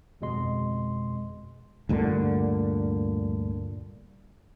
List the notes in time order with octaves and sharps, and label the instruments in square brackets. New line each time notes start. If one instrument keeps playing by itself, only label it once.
[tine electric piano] G1 F2 B2 G#3 D#5 C6
[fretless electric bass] D2 G2 A#2 D3